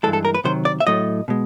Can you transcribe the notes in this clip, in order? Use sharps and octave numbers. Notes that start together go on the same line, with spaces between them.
G2 E3 G#3 A4
A4
A#4
B4
C3 D#3 F#3 C5
D5
E5
A2 F#3 A3 D#5
B2 G#3